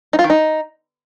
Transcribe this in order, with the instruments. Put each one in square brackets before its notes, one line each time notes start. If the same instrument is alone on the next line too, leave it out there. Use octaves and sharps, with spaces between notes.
[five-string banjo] D#4
F4
D#3
D#4